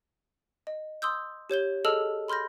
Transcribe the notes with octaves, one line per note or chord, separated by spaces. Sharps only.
D#5
C6 D#6 E6 G6
G4 C#5 G6 G7
G#4 A4 D#5 A5 E6 F6
B5 C6 F6 G6 A#6